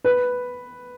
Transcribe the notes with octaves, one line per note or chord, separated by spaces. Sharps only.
B4